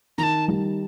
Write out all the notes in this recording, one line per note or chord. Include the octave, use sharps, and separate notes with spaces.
D#3 A5 A#5
G3